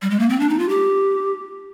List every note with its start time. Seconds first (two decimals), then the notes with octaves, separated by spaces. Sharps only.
0.02 G3
0.10 G#3
0.20 A#3
0.29 C4
0.40 D4
0.49 D#4
0.59 F4
0.69 G4